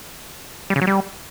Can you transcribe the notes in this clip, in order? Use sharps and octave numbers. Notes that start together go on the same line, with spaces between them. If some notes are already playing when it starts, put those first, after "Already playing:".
G3
C#3
F#3
G3